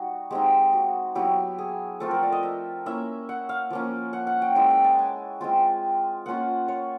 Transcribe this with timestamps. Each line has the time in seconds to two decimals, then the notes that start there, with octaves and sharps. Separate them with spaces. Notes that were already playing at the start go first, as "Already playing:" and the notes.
Already playing: G3 D#4 F#4
0.31 G#3 C4 D#4 G4
0.73 F#4
1.15 F#3 B3 E4 G4
1.58 G#4
2.00 F3 A3 C4 F4 A4
2.11 A#4
2.23 D5
2.32 D#5
2.43 E5
2.86 A#3 C#4 E4 E5
3.29 F#5
3.49 F5
3.70 F3 A#3 C#4
4.13 F#5
4.27 F#5
4.42 G5
4.55 G#3 C#4 E4 G#5
4.70 G5
4.84 A5
4.99 G#5
5.41 G#3 C4 F4 G5
6.26 A#3 C#4 F4 F#5
6.68 C#5